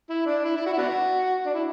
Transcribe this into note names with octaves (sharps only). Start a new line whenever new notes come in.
E4
D4
E4
E4
F#4
E4
B3 D4 F#4
D4
E4